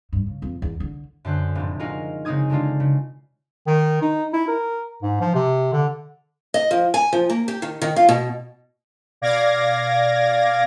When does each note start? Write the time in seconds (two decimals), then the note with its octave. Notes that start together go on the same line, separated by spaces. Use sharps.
0.13 G2
0.26 C#3
0.42 F2
0.62 E2
0.80 D3
1.25 F#2 D3 C5 F#6
1.55 F1 A2
1.79 G#3 D#4 F4 F#4 A#4
2.25 C#3 G#3 C4 D#4 D#6 G#6
2.50 D3 G#3 D4 F4
2.80 C#3
3.67 D#3
4.02 D#4
4.33 E4
4.48 A#4
5.02 G#2
5.21 F3
5.35 C3
5.73 D3
6.54 D#5
6.71 F3
6.94 G#5
7.13 F3
7.30 A#3
7.48 G4
7.62 D#3
7.82 D#3
7.96 F4
8.09 B2
9.21 B2 D5 F5 D6 G#6 A#6